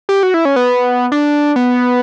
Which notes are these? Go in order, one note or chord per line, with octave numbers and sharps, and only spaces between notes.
G4
F#4
E4
C#4
B3
D4
B3